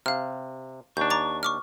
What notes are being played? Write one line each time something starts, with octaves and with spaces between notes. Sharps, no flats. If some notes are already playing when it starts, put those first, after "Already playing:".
C3 F5 F6
D#2 D4 C#6 G6
A#5 D6 A6
C#6 D6 F6